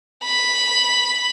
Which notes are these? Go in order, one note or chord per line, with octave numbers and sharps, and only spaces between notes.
B5